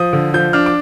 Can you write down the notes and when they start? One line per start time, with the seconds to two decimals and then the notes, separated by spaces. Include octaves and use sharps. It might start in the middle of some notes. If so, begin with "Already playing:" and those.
Already playing: F3 D#6
0.13 D3
0.34 F3 G6
0.53 D4 F6
0.66 D6